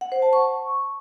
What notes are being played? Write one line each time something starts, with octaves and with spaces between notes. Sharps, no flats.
F#5
C5
A5
C#6